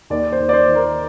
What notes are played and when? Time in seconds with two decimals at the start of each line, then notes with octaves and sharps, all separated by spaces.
0.10 D#2 D5
0.32 C5
0.40 D#2
0.49 D5
0.53 C5
0.68 D#3
0.75 A#4